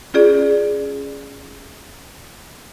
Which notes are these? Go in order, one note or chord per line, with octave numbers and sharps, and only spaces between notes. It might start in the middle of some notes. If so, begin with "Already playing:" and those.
C#4 F4 G#4 D5